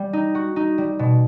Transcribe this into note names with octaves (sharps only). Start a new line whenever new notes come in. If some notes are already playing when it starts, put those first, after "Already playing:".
Already playing: G3
D#4
F#4
D#4
G3
B2